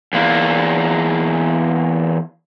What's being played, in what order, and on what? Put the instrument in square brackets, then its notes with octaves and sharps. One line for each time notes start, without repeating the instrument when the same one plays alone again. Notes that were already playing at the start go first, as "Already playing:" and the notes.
[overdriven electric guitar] E2 A#3